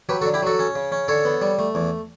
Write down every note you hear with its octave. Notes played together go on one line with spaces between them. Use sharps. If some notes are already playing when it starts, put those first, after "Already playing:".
F#3 G4 B4
F#4 A4
D3
E4 G4
F#3 F#4 A4
C#4
C#3
C#4
D3 A4 C#5
B3
G3
A3
E2